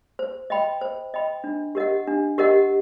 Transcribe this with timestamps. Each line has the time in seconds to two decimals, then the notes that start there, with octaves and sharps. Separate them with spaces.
0.19 C5
0.50 D#5 G5 B5
0.81 C5
1.14 D#5 G5 B5
1.44 D4
1.75 G4 A#4 D#5 F#5
2.07 D4
2.38 G4 A#4 D#5 F#5